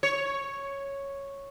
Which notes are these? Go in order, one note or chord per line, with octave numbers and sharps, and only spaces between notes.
C#5